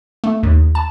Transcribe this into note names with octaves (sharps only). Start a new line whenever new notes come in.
A3
D#2
A5